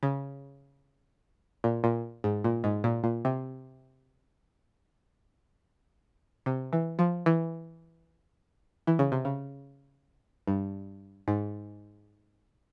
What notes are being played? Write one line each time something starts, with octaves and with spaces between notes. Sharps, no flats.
C#3
A#2
A#2
G#2
A#2
G#2
A#2
A#2
C3
C3
E3
F3
E3
E3
C#3
C3
C#3
G2
G#2